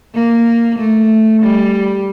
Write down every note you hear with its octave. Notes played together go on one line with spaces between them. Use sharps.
A#3
A3
G3